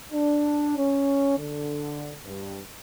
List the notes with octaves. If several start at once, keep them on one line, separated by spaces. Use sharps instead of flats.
D4
C#4
D3
G2